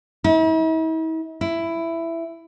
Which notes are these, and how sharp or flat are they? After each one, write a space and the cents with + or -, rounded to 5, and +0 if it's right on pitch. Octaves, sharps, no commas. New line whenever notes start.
E4 -45
E4 +10